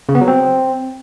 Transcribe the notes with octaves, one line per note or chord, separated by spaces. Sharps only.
C#3
B3
F#3
C4